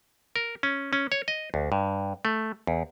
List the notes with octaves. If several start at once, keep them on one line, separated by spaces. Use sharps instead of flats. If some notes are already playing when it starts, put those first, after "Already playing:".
A#4
C#4
C#4
C#5
D#5
D2
G2
A3
E2